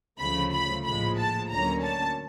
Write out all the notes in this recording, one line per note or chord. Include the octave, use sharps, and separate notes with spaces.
D2 C#3 F3 A3 B5
B5
A#1 A2 F3 G#3 B5
A5
D2 D3 F#3 A#3 C#4 A#5
A5